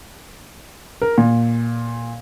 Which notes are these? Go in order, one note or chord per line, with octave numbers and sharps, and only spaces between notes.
A#4
A#2